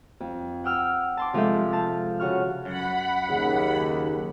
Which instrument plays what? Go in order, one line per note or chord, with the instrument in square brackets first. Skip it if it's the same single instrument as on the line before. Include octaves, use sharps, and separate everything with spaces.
[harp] F2
F#5 G5 E6 F6
A5 C6 D6
C3 F3 G#3 A4 E5 G6
F5 A5
C#3 F#4 C#6 F6
[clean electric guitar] F#2 [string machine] F#5 B5
[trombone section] D#2 [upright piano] C#3